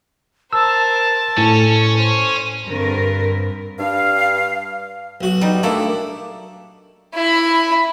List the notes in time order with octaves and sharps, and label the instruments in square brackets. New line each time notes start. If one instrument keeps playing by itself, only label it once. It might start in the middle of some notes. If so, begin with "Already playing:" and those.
[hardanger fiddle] A#4 C5 [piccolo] A5 [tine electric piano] E6
[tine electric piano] A2 [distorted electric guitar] C#4 [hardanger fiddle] A4
[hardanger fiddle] C5 [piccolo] D#7
[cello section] G2 D3 C4 A#4 B4
[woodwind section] G2 F5
[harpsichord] B1 F#4
[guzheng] G3 D#4
[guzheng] A3 A#3 D4 [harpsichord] E4
[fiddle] E4 B5